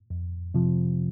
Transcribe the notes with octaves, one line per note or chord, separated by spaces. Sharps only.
F2
C3 F3